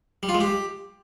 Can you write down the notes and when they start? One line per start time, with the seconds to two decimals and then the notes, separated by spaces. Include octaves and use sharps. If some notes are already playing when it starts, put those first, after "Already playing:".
0.23 G3
0.29 F4
0.35 G#3
0.40 G4